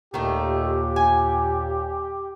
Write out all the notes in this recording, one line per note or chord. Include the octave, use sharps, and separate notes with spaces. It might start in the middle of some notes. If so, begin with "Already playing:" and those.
D#2 A#2 D#3 A3 G4
G#5